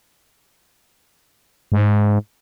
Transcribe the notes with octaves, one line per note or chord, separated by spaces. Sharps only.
G#2